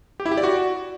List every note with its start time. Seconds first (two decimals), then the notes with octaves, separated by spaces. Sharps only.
0.20 G4
0.26 E4
0.32 G4
0.37 D5
0.43 F#4